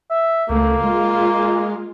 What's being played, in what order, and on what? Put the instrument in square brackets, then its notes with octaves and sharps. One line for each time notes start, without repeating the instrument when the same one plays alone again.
[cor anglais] E5
[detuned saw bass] C#2 [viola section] A3 [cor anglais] A#3
[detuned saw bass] G#3 [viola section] F4